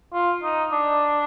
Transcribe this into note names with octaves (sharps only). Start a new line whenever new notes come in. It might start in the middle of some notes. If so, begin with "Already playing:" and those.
F4
D#4
D4